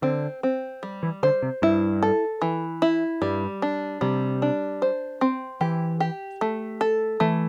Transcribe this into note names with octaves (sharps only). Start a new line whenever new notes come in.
D3 C4
C4
G3
E3
D3 C5
C3
G2 E4
A4
E3
E4
G2 G3
D4
C3 G3
D4
C5
C4
E3 G4
G4
A3
A4
E3 A3